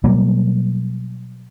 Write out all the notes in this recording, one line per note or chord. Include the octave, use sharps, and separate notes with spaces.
B2 F#3 G3 A#3